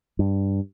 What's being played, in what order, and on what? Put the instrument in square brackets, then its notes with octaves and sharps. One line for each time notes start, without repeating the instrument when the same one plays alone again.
[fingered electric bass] G2